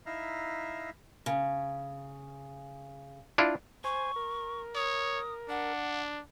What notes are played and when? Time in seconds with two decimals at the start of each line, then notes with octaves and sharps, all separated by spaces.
0.06 D#4 E4 E5 F5 A#5
1.26 C#3
3.38 D4 E4 F4
3.84 C5 G#5 C#6
4.16 A#4
4.75 C#5 D#6
5.49 D4 F#5